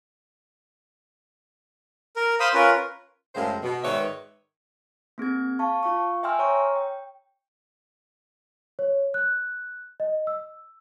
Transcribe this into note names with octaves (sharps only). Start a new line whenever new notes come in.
A#4
C5 F5 B5 C6 D#6
C#4 F4 A#4 B4
F#2 A2 C#3 G#3 A#3 C5
B2
G#2 D#3 B4 C#5 D5 E5
A#3 C4 G#4 G#6
F5 A5 C#6
F4 F5 C#6
E5 G5 G#5 C6 E6 F6
C#5 A#5 C#6
G5
C#5
F#6
D#5
E6